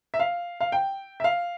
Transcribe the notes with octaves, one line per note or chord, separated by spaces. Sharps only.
E5
F5
F5
G5
E5
F5